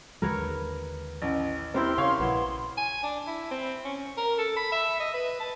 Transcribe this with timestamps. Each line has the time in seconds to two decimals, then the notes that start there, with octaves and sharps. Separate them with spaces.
0.22 D#2 D3 G#3 A#4 B4 C#5
1.22 A1
1.74 C4 E4 G4 A#4 C6
1.98 C#3 C#5 F5
2.20 A#1 B3 E4
2.77 G#5
3.03 D4
3.27 E4
3.51 C4
3.85 C#4
4.17 A#4
4.38 A4
4.57 B5
4.72 E5
5.00 D#5
5.14 B4
5.40 A5